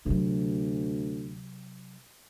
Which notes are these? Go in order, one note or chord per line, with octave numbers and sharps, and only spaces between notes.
D2 C3 F#3